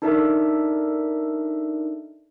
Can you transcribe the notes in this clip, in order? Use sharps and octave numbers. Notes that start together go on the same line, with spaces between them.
D4 D#4 A4 A#4 D5 E5